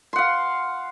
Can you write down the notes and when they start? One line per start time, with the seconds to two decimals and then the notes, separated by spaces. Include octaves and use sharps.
0.13 C6
0.16 F#5
0.18 F5